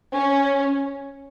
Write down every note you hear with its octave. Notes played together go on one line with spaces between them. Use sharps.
C#4